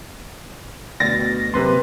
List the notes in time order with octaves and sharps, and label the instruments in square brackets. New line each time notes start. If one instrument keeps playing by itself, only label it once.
[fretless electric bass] D2 B2 [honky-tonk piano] A6 A#6
[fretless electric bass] F#2 A#3 [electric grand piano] C3 B4 C6